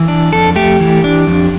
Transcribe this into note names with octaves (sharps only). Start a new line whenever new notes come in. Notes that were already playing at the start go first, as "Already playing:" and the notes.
Already playing: E3
D4
F2 A4
A3 G4
E3
D4
F2